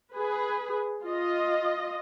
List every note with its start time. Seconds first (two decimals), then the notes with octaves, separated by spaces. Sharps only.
0.13 G#4 B4
1.03 F4 D#5